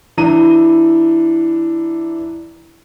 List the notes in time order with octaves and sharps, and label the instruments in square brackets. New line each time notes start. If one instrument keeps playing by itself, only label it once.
[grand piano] E3 D4 A#5 D#7